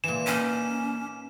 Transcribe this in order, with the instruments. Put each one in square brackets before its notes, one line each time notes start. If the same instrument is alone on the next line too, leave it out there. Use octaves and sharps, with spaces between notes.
[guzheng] A#2 E3 [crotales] E7
[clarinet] A#3 [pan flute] C#4 [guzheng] D#4